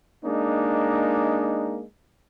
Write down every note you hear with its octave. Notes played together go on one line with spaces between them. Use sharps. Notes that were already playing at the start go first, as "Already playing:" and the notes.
G#3 A#3 D4 D#4